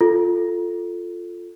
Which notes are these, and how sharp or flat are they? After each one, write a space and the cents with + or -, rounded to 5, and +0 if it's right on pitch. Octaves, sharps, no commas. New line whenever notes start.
F4 +0 A4 +0